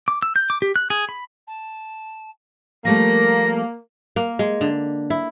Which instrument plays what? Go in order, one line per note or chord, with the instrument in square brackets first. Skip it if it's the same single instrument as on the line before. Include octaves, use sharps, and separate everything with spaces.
[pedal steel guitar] D6
E6
G6
D6
G4
F#6
G#4
B5
[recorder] A5
[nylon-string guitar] F3 G3 A3 [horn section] A#3 [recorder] A#6
[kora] A#3
G#3
D3
E4